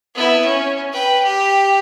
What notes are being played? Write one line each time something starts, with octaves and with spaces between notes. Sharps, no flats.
B3 E4
C#4
B4 G5
G4